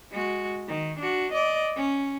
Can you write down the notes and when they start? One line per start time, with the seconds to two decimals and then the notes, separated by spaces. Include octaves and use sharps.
0.11 G#3 F#4
0.68 D#3
0.99 D4 F#4
1.32 D5 D#5
1.76 C#4